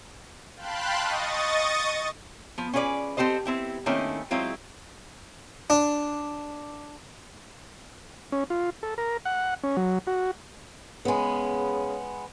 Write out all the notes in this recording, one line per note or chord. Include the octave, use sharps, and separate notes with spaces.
F5 G5 A5 B5 C6 F#6
D#5 C#6 D#6 A6
F3 B3
C#4 F4 G#4 B4 D5
C4 G4 A4 C5 D#5
B3 C4 E4 G4
D#3 A3 A#3 C4 C#4 E4
F#3 G#3 C4 E4 F4
D4
C#4
F4
A4
A#4
F#5
C#4
F#3
F#4
C#3 G#3 B3